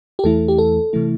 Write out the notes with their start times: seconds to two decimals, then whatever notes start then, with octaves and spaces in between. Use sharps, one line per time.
0.19 G4
0.24 E2 E3 A3 E4 A4
0.48 G4
0.58 A4
0.93 C3 E3 A3 E4